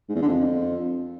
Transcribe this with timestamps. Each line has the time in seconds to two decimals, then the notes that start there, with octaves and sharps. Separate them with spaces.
0.09 G#2
0.16 E2
0.22 D3
0.28 F2